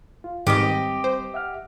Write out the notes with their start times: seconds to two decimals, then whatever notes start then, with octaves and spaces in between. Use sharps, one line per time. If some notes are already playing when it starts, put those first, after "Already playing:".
0.24 F4
0.47 G#2 D#3 G3 C4 G4 B4 D#5
1.04 C5
1.34 E5 F#5 F6